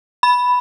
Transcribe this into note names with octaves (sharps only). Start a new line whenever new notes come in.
B5